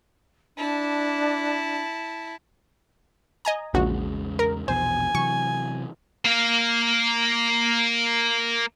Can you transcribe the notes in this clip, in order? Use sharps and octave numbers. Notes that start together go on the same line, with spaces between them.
D4 E4 A5
D#5 G#5 A#5
A#1 E2 C#3 G#3 F#4
A#4
A#1 E2 B2 C5 G#5
C3 E3 F#3 C#6
A#3 F5